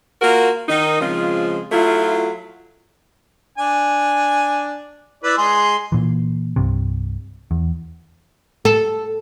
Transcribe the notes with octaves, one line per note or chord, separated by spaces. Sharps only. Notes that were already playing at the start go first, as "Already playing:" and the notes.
A#3 F4 F#4 A#4
D#3 D#4
C#3 F3 G#3 C4 F4
F#3 A3 E4 F4
D4 G#5
E4 B4 D5
G#3 G#4 C6
A#2 E3
C2 G2 C3
E2
A4